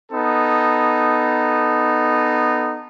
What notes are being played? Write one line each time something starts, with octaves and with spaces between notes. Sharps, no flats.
B3 D#4 A4